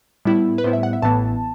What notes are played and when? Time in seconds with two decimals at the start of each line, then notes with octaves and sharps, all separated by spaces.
0.25 A2 G3 B3 E4
0.58 B4
0.64 A2 G3 B3 E4 C5
0.73 E5
0.83 F#5
0.93 E5
1.02 A1 A2 E3 B3 A5